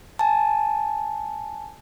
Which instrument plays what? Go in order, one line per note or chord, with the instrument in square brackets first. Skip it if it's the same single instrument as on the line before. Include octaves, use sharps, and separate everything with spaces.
[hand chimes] G#5 A5